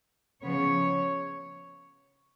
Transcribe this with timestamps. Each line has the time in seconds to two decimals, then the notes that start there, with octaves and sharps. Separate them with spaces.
0.44 C#3 F3 B3 C#5